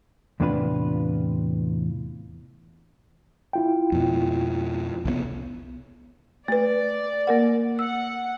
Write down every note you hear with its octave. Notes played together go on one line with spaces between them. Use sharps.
E2 A2 C3 D4 F4 B4
E4 F4 G5
F2 B2
C2 E3 B3
A3 B4 D5
A#3 A#4 F#5
F#5 E6